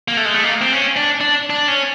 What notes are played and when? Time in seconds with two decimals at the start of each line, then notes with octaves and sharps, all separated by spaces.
0.08 A#3
0.17 A3
0.25 G#3
0.34 A3
0.43 A#3
0.62 C4
0.73 C#4
0.97 D4
1.21 D4
1.50 D4
1.68 C#4